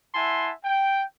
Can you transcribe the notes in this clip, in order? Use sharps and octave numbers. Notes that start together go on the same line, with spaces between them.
E4 E5 F#5 G#5 A5 C6
G5